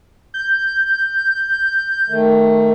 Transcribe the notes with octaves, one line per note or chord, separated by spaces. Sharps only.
G6
D#3 A3